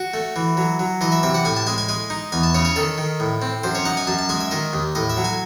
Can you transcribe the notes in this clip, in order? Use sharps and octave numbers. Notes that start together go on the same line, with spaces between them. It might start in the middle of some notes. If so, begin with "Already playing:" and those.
Already playing: F#4
A3
E3
F#3
F#3
E3 D#5
E5
C3 E5
F#5
A2 G#5
A5
G#3 G#5
G#5
G#3 G#5
D#4
E2 G#5
A5
C#3 C#5
C#5
D#3 A4
D#3
A2
C4
F#2 C5
C#5
D#4 F#5
G#5
F#2 A5
A5
G#3 G#5
E5
D#3 D#5
D#2
A2 D#5
E5
F#3
G#5